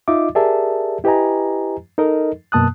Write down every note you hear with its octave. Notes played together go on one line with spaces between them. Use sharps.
D#4 F4 D#5 E5 D6
G4 G#4 A#4 D5 E5 A5
E4 G4 B4 D#5 G#5 A#5
D#4 A4 A#4 D#5
F#2 B2 A#3 A5 D#6 F#6